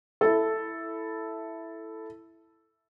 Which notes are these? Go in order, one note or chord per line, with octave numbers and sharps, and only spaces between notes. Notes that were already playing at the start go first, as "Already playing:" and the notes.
E4 A4